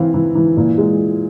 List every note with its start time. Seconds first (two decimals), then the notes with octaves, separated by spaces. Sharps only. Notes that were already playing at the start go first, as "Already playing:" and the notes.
Already playing: E3 C4 F5
0.14 E3
0.35 E3
0.57 A#2
0.78 G#3